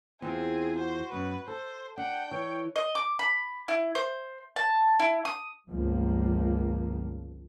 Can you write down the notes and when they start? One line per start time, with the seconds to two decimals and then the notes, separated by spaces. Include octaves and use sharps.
0.22 E2 C4 F4 G#4
0.78 F#4 C5
1.12 F#2 B3 B4
1.48 A4 C5
1.98 D4 F#5 G5
2.31 E3 C#5
2.76 D#5
2.95 D6
3.19 B5
3.68 E4
3.95 C5
4.56 A5
4.99 E4
5.25 D#6
5.68 G1 C#2 G2 F3 A#3